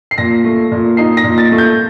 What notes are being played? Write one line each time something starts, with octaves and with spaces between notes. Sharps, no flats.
C7
A#2 A#6
A3
A#2
D#4 C7
A#6
A#2
A6
A3
G6